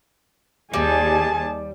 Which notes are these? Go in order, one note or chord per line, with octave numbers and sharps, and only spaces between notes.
D#2 G3 G#4 G#5 A5